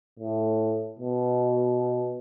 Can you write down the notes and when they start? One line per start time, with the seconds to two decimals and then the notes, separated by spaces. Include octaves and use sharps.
0.19 A2
0.99 B2